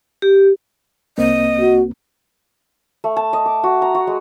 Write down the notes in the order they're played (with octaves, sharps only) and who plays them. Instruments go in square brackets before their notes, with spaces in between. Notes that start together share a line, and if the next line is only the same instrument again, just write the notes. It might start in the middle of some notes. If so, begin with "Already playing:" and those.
[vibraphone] G4
[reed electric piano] C2 A#3 C4 [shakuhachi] D#5
[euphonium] F#4
[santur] A3
A5
D#5
D6
F#4
A#5
F#4
G#3